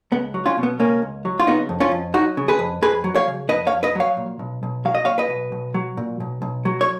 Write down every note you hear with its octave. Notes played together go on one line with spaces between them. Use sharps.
C#2 B3
F#3
C#4 F4
B2
B3
C#2 A#3 C#4
C#2
F#3
F4
C#3 B3 D#4
F2
C#4 F4
F2
F#3 D#4 F#4
C#3
G#4 B4
F2
F2 G#4 B4
F#3
C#5 F5
C#3
F2 B4 D#5
C#5 F5
F2
B4 D#5
F#3 C#5 F5
A#2
B1
B1
F#3 F5
D#5
A#2 C#5 F5
B4 D#5
B1
B1
F#3
A#2
B1
B1
F#3
C#5